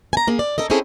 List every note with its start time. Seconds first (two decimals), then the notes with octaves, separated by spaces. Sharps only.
0.13 G#5 A#5
0.27 A#3 G#4
0.39 D5
0.58 A4 A#4 D#5
0.70 C4 C#4 D#4 E4 G#4 A4